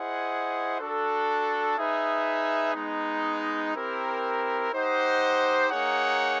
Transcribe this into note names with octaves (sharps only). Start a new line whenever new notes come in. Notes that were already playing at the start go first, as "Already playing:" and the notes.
Already playing: E4 G#4 C5 D#5 F#5
D4 F#4 A4
D#4 G#4 B4 E5
G#3 B3 D#4
C4 E4 G4 A#4
D#4 G4 C5 D#5 F#5
A#3 D#4 G#4 C#5 F#5